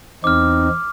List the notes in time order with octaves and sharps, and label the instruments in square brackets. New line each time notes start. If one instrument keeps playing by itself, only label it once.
[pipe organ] E2 C4 D#4 [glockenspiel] D6 F6